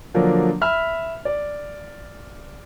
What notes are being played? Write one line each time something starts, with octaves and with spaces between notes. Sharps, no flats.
D3 F3 F#3 A#3 D4
E5 B5 F6
D5